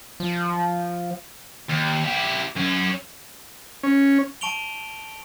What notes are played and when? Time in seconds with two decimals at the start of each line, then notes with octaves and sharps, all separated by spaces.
0.20 F3
1.69 D#2
2.04 E4 G4
2.56 F#2 C#4
3.83 C#4
4.41 A5 C#6 D7 F7 G7